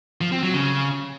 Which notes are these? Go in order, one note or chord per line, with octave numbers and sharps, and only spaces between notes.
F3
C4
F#3
C#3